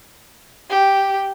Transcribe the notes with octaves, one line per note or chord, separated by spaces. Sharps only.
G4